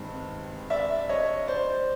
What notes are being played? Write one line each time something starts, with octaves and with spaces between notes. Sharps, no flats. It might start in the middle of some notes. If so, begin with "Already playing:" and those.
Already playing: G2 D#3 G#3 C4
D5 E5
C#5 D#5
C5 D5